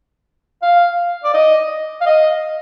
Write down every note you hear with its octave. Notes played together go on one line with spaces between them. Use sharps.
F5
D5
D#5
F5
D#5